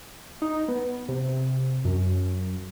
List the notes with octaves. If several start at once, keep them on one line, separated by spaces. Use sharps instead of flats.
D#4
B3
C3
F#2